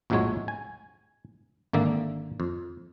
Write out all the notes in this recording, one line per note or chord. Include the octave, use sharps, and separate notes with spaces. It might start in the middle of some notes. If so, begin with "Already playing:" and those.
A#1 F2 A2 F#3 G#3 C#5
G#5
G#1 D3 A#3 E5
F2